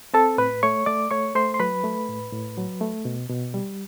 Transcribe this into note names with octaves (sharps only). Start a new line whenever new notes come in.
C4 A4 A5
A2 B4 B5
A3 C#5 C#6
A3 D5 D6
A3 C#5 C#6
A3 C5 C6
C6
F#3 B4 B5
A3
A2
A2
F#3
A3
B2
B2
G3